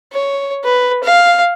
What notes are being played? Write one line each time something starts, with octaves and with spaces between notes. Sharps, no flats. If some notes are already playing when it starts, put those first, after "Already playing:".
C#5
B4
F5